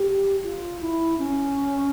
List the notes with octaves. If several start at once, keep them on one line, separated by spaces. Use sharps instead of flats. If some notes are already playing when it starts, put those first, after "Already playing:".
Already playing: G4
F4
E4
C#4